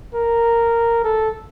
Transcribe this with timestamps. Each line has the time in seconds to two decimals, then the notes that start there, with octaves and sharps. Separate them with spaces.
0.14 A#4
1.04 A4